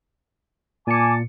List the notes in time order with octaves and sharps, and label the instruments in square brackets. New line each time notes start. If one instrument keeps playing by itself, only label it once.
[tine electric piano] A#2 C#7 [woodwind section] G#5 A5 D6